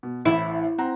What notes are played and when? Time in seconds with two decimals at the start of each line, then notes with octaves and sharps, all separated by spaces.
0.03 B2
0.25 A1 A2 E4
0.78 C4 F#5 A#5